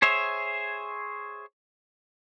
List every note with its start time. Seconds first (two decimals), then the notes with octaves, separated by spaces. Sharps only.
0.02 G#4 C5 C#5 E5